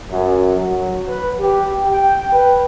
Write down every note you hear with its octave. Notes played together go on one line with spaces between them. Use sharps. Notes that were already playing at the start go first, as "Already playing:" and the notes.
F#2
F#3
B4
G4
G5
B4